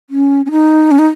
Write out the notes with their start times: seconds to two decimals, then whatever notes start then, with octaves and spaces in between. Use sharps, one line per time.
0.10 C#4
0.46 C#4
0.51 D#4
0.91 C#4
0.99 D#4